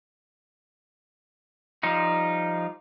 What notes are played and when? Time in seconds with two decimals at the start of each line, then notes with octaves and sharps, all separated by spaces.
1.83 F3 G3 D#4 F4